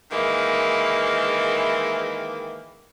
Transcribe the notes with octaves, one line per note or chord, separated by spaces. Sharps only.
D#3 E3 G#3 A#3